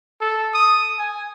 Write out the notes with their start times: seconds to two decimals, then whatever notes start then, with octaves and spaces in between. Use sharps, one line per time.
0.21 A4
0.54 D#6
0.99 G#5